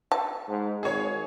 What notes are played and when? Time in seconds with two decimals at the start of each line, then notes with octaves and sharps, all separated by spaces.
0.12 A5
0.48 G#2
0.83 G#1 G#4 C#5